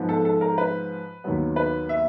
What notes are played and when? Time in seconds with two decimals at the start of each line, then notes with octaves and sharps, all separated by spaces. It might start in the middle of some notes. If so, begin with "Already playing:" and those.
Already playing: G#2 F3 G#3 B3
0.09 A4
0.25 A4
0.41 A#4
0.58 B4
1.24 D#2 D#3 F#3 B3
1.56 B4
1.89 E5